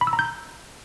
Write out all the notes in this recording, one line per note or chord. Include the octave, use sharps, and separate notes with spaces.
B5
E6
A#5
G6